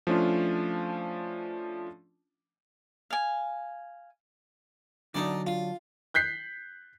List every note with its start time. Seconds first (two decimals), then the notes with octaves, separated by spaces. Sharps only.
0.07 F3 A3 C#4 D4 F4
3.10 F5 G#5
5.14 D3 F#3 D4 D#4 D5
5.47 F4
6.14 F#6 G6 B6 C7